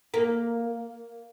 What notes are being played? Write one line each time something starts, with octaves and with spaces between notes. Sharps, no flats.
A#3